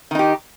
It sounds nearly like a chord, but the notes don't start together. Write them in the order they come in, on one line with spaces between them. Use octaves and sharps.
D#3 D#4 G4